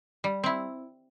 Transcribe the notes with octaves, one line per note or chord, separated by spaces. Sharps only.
G3
C4 E4